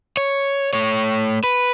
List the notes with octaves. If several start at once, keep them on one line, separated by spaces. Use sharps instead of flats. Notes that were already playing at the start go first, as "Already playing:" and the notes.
C#5
A3 C#5
B4